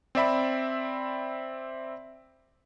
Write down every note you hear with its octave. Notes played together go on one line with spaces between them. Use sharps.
C4 D5 E5 B5